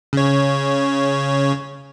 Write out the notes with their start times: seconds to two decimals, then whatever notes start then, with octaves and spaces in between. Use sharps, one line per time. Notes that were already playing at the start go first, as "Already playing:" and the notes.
0.13 C#3 C#5